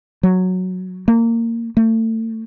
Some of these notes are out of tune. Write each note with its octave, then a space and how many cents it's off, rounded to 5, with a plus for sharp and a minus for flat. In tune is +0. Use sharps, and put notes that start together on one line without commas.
F#3 -5
A#3 -20
A3 +35